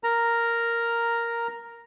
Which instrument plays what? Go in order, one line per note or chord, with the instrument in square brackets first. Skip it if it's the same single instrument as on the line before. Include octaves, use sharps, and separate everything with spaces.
[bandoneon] A#4 A#5